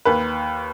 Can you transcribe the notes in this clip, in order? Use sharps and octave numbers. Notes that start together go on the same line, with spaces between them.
D#2 B4